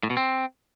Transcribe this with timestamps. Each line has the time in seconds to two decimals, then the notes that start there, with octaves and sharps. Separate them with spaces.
0.03 A2
0.10 B2
0.17 C4